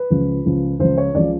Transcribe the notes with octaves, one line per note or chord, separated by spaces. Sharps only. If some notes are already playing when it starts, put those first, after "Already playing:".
Already playing: B4
C#2 C#3 F3
C#2 C#3 F3
C#2 C#3 F3 C5
C#5
C#2 C#3 F3 D5